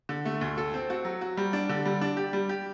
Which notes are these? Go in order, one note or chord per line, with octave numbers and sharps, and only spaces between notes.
D3
A3
D2
A4
C4
F#4
F#3
F#4
G3
D4
D3
G3
D4
G4
G3
G4